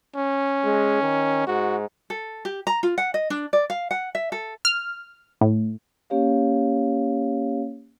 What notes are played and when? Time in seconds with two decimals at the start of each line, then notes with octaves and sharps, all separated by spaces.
0.16 C#4
0.64 G#3
1.02 D#3
1.47 G#2 F#4
2.10 A4
2.45 G4
2.67 A#5
2.83 F4
2.98 F#5
3.14 D#5
3.30 D4
3.53 D5
3.70 F5
3.91 F#5
4.15 E5
4.32 A4
4.65 F6
5.41 A2
6.10 A#3 C#4 G4 C#5 F5